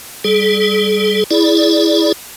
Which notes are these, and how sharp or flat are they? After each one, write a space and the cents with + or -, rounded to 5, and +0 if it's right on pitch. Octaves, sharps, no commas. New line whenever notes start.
G3 +0 G#4 +40
E4 -5 G#4 +0 D5 +0